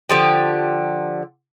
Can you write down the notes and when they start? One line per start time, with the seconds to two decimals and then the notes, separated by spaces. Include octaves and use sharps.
0.09 D3 F3 G4